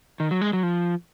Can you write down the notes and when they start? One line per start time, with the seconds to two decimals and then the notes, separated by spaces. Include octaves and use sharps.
0.20 D#3
0.31 F#3
0.41 G#3
0.53 F#3
0.63 F3